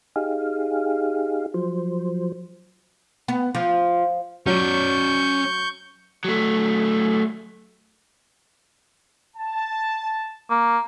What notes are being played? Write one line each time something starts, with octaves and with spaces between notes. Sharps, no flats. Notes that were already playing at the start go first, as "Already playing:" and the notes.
D#4 G4 G#4 F5
F3 F#3 C5
B3
F3
F#3 C#4 D5 C#6 G6
F#3 A3
A5
A#3